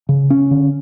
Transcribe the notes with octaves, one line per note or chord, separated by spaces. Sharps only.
C#3
C#4
D3